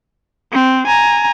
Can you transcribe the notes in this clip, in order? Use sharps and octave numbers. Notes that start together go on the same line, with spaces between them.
C4
G#5 A#5